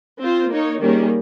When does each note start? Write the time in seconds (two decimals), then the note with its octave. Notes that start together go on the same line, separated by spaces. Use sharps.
0.19 C4 F4 C5
0.49 A#3 D#4 A#4 C#5
0.80 D#3 G3 A#3 C#4 G#4